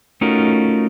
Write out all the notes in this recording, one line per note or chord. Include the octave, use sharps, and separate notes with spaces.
A3 C#4 D#4 F4 F#4 A#4